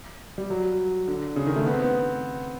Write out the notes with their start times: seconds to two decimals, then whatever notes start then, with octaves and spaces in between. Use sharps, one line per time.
0.38 G3
0.50 F#3
1.08 D3
1.36 C#3
1.46 D#3
1.56 A3
1.66 B3
1.73 C4
1.82 B3